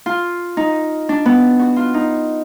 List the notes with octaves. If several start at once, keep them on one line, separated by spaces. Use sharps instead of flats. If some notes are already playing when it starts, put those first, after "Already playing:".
F4
D#4
D4
B3
F#4
F4
D#4